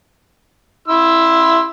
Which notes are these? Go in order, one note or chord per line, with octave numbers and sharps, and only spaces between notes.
E4 C6 E6